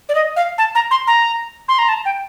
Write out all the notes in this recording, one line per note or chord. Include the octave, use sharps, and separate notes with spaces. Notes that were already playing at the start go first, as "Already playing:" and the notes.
D5
D#5
F5
A5
A#5
C6
A#5
C6
A#5
A5
G5